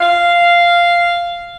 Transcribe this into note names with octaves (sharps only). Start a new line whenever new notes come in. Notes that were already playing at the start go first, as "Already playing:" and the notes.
F5